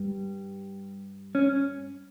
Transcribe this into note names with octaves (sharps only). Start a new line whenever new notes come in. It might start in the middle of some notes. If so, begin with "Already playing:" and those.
Already playing: G2 G3
C#4